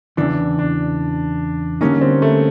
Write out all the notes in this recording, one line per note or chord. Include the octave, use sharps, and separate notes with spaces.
E2 C#3 E3 D4
D4
D3 G3 A#3 C#4 D#4
C4
A3